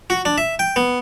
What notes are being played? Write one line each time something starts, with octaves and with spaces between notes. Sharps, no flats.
F#4
D4
E5
G5
B3